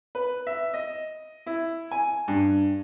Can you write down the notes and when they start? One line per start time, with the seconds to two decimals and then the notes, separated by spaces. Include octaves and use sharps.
0.15 B4
0.47 E5
0.74 D#5
1.47 E4
1.91 G#5
2.28 G2